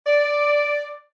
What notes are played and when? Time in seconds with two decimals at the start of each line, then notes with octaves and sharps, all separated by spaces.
0.07 D5